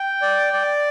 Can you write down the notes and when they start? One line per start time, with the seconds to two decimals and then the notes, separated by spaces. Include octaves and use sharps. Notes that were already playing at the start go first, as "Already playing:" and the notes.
Already playing: G5
0.22 D5
0.53 D5